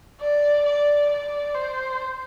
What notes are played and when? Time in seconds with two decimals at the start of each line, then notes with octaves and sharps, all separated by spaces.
0.22 D5
0.66 D5
1.10 D5
1.55 C5